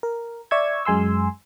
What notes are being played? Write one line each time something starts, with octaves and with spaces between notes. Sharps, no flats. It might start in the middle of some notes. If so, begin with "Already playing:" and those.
A#4
D5 E5 C#6 E6 G#6
F#2 G#3 G#5 C6 E6